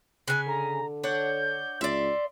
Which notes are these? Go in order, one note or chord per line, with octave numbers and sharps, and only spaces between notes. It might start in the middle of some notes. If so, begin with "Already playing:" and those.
C#3 G#5 F#6
D3 A#5
D4 C#5 F#5 G6
C#2 D5 E5 C6